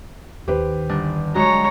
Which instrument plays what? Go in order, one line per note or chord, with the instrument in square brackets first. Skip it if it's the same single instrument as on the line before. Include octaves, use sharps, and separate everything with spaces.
[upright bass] D#2 D#3 [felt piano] G4 B4 C5
[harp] G1 D4
[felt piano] F#3 [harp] G#3 F#4 [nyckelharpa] C#5 A#5